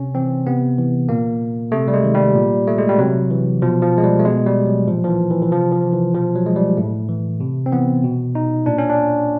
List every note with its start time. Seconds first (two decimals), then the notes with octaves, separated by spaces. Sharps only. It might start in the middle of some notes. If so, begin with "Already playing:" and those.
Already playing: C3 C#4
0.15 E3 C4
0.47 C3 B3
0.78 E3
1.09 A#2 A#3
1.72 C3 A3
1.88 G3
1.94 G#3
2.04 D#3
2.15 G3
2.35 A#2
2.67 A3
2.78 G#3
2.89 G3
2.98 C3 F#3
3.31 E3
3.62 B2 F3
3.82 F3
3.98 G#3
4.03 G3
4.20 A3
4.25 B2 G#3
4.46 G3
4.67 F#3
4.88 A#2 F3
5.04 F3
5.08 E3
5.31 E3
5.42 E3
5.51 C3 F3
5.72 F3
5.82 E3
5.93 E3
6.14 B2 F3
6.36 F#3
6.46 G#3
6.56 G3
6.77 A2 A3
7.09 E3
7.40 C3
7.66 C4
7.72 E3 B3
8.04 B2
8.35 D#4
8.66 A#2 D4
8.78 C#4
8.90 D4